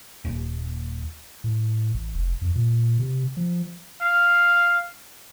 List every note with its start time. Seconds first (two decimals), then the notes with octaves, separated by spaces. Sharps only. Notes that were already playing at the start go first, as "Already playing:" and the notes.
0.25 D#1
1.44 A2
1.94 A1
2.15 F1
2.41 F2
2.55 A#2
2.99 C3
3.37 F3
4.01 F5